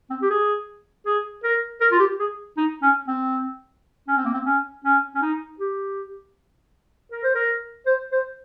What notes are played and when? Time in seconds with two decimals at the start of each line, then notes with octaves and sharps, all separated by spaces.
0.10 C4
0.22 G4
0.30 G#4
1.06 G#4
1.43 A#4
1.81 A#4
1.91 F4
1.99 G4
2.19 G#4
2.57 D#4
2.82 C#4
3.08 C4
4.08 C#4
4.17 C4
4.25 A#3
4.34 C4
4.45 C#4
4.84 C#4
5.15 C#4
5.22 D#4
5.59 G4
7.11 A#4
7.23 C5
7.35 A#4
7.86 C5
8.12 C5